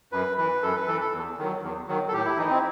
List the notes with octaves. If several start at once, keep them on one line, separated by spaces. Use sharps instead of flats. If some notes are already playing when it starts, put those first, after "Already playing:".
F#2 B4
E3 B4
F#2 A4
B4
E3 A4
A4
E2
D#3 F#3
E2
D#3 F#3
A4
A2 G4
E4
E3 D#4
C4